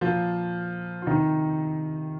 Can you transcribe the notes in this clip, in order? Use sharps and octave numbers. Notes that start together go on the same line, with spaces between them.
A#2 F3 F4
F4
C3 D#3 D#4